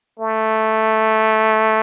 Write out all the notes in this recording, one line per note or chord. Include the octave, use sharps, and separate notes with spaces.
A3